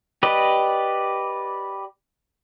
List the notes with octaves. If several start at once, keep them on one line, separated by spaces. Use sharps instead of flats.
G4 B4 D5 D#5